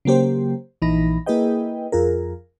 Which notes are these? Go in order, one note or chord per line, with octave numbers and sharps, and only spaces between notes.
C#3 F#3 A#3 G4 C5
A#1 E3 D#4 B5 A#6
A#3 E4 G#4 B4 D#5 G5
F2 F4 G#4 A#4